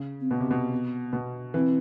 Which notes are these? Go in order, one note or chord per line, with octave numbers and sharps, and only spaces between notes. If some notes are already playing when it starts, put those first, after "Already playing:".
Already playing: C#3
C4
B2 B3
C3
B2
B3
B2
E3 C4